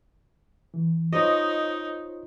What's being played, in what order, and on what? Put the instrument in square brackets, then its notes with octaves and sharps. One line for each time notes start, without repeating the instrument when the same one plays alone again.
[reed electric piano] E3
[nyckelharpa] D#4 [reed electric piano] F4 C5 C#5 [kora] D#5